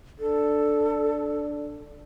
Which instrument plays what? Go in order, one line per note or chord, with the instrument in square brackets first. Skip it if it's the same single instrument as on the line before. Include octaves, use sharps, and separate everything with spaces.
[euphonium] D4 [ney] A4